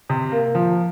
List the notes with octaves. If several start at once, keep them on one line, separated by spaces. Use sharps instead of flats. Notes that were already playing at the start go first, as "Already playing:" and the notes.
C3
A#3
F3